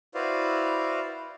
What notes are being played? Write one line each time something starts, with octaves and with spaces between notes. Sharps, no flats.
E4 F#4 B4 C5 D5 F5